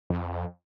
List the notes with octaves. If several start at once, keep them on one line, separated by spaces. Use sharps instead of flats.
F2